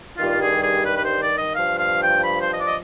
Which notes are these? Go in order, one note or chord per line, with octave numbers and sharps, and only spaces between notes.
G2 D#3 G3 F4
G#4
G#4
B4
B4
C5
D5
D#5
G2 F3 F5
F5
G5
B5
C5
D#5
D5
D#5